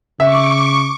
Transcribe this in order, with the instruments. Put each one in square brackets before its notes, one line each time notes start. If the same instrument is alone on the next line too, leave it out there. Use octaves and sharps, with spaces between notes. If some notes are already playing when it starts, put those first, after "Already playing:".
[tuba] C#3 [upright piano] E5 [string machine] C#6 D6